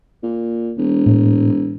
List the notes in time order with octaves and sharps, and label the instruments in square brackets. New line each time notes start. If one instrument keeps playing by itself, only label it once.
[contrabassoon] A#2
E1
[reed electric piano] A2